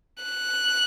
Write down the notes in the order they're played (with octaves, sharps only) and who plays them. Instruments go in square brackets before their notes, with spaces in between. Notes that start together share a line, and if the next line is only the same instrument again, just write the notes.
[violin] F#6